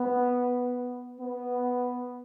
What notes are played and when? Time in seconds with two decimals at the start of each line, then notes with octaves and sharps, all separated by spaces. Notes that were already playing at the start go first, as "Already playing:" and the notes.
Already playing: B3
1.19 B3